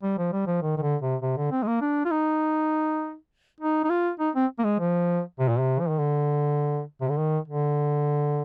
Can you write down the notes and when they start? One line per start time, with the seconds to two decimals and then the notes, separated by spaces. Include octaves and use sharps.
0.03 G3
0.18 F3
0.33 G3
0.47 F3
0.62 D#3
0.78 D#3
0.82 D3
1.02 C3
1.22 C3
1.37 D3
1.51 C4
1.63 G#3
1.67 A#3
1.82 D4
2.05 F4
2.11 D#4
3.61 D#4
3.84 D#4
3.90 F4
4.20 D#4
4.35 C4
4.59 A#3
4.64 G#3
4.79 F3
5.39 C3
5.49 A#2
5.59 C3
5.80 F3
5.89 D#3
5.98 D3
7.01 C3
7.10 D3
7.17 D#3
7.48 D3